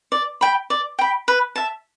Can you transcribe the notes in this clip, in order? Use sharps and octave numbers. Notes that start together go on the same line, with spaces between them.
D5
G5 B5
D5
G5 B5
B4
E5 A5